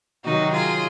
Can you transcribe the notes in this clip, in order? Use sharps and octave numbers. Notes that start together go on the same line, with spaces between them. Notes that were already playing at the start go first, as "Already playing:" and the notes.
C3 D#3 F#3 D#4 F#4
F4 G#4